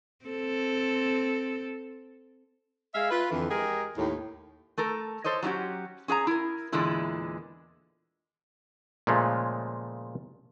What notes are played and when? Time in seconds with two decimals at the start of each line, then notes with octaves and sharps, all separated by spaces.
0.25 C4 A4
2.94 G#3 E5 F5
3.11 F4 B4
3.31 F2 D3 E3
3.50 G#3 G4 G#4 A#4
3.97 D#2 A2
4.78 A3 A4 A#4
5.24 A4 C5 C#5 D#5
5.43 F#3 C#4 D#4 F#4 G4
6.08 C#4 G#4 F5 A#5
6.27 E4 A#4
6.72 E2 A#2 D3 G#3 E4
9.07 A#2 C#3 F3 G#3 A3